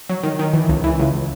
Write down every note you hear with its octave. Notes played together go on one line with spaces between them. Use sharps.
F#3
D#3
D#3
E3
C#2
E3
C#2